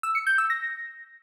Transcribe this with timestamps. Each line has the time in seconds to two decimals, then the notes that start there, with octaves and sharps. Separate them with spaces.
0.03 E6
0.15 C#7
0.27 G6
0.38 E6
0.50 A#6